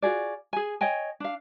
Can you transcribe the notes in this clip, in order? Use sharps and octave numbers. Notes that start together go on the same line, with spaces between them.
F4 F#4 G#4 D5
G#4 G#5
C#5 D#5 G5 G#5
D4 F5